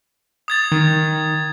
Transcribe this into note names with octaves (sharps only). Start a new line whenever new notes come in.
D#6 G#6 A6
D#3